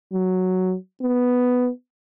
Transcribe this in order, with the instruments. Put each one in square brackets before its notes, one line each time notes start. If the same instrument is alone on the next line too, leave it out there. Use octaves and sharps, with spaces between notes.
[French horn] F#3
B3